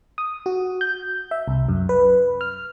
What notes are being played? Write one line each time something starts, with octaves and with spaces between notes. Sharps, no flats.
D#6
F#4
G6
E5
C2
F#2
B4
F6